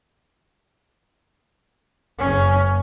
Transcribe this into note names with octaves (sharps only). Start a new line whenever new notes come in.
F#1 C#4